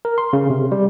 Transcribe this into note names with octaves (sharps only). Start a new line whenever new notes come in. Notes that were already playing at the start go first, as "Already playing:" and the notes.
A#4
C6
C#3
C3
G3